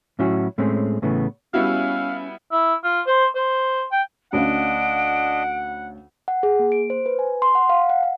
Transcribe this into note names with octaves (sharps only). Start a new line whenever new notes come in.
A2 F#3 C#4 E4 F#4
A2 G#3 A3 C4 C#4
A2 C#3 E3 A3 B3
G3 B3 C#4 E4 F#4 E5 F5
E4
F4
C5
C5
G5
D2 C#4 D4 D#5 F5 F#5 D7
F#5
G#4
A#3
D7
C5
B4
G#5
C6
F#5
F5
F#5
F#5